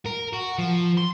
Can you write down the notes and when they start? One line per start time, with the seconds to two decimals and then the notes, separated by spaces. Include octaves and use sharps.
0.06 A#4
0.33 F#4
0.58 F3
0.98 C6